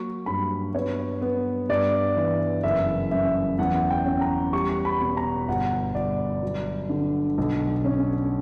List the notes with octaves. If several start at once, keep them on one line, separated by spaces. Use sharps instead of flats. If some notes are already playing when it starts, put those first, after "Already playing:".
Already playing: F#3 A#3 C#6
G2 B5
B3 C#5
B3
G2 D5
E3
F#1 E5
F#2 E5
E2 F#5
G5
C#4
A#5
G3 C#6
C#6
B5
B2
A#5
G1 F#5
G1 D5
F#3
D3
B1
C#4